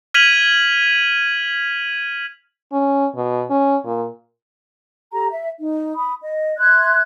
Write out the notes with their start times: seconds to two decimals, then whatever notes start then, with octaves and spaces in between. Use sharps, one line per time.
0.14 F6 G#6 B6 D#7 F7 F#7
2.72 C#4
3.16 B2
3.50 C#4
3.85 A#2
5.13 G4 A4 A#5
5.30 E5
5.58 D#4
5.94 B5 D#6
6.22 D#5
6.59 E5 C6 F#6 G#6